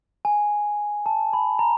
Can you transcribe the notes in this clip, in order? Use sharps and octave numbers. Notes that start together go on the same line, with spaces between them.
G#5
A5
B5
A#5